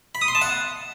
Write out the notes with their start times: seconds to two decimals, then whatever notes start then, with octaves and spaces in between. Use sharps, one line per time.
0.15 B5
0.21 D#6
0.28 C6
0.35 A5
0.42 F#5